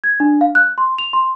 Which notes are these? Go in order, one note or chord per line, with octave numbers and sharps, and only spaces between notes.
G#6
D4
F5
F#6
C6
F7
C6